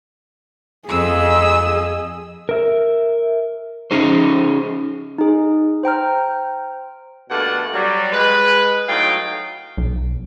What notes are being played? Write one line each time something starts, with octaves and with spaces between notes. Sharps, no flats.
F2 G#4 D#5 E6
A#4 E5
C#4 D#4 G#4 C5
D#4 G#4
C5 G5 A#5 F6
G2 B2 A3 A#3 D4 F#5
F#3 G3
G#3 B4
A2 F#3 D#4 F5 G5
B1